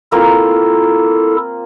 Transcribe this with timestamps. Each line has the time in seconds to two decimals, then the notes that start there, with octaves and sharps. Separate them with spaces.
0.12 A#3 C4 E4 F4 A4